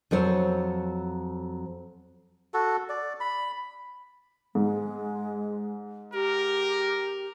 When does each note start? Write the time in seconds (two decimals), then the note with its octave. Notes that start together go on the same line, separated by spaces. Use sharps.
0.11 F2 F#3 C5 C#5
2.54 F#4 A4
2.89 D5
3.20 B5
4.55 G#2 G#3
6.14 G4 A#4